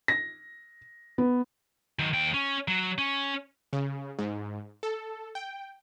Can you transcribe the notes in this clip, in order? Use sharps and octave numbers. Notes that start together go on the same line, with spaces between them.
A#6
B3
D#3 F#3
D#2 G5
C#4
F#3
C#4
C#3
G#2
A4
G5